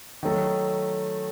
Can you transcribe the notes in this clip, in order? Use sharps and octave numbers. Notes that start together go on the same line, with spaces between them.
D#3 F#3 A3